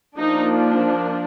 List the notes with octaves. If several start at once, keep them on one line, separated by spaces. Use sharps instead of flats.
F3 A#3 D4 D#4